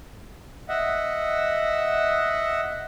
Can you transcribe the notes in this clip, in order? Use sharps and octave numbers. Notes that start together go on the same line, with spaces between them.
D#5 E5 F#5